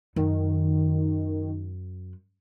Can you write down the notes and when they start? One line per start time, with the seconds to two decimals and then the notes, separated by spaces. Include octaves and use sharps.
0.16 F#2 D#3